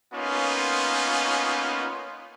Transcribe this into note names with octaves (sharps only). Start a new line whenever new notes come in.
A#3 B3 C#4 D#4 F4